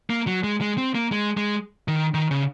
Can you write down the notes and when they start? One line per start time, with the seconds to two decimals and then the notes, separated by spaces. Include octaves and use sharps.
0.10 A#3
0.27 F#3
0.44 G#3
0.61 G#3
0.78 C4
0.95 A#3
1.12 G#3
1.37 G#3
1.88 D#3
2.14 D#3
2.31 C#3